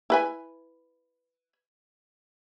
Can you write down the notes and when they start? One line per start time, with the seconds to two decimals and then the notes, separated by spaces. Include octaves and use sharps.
0.10 E4 B4 G#5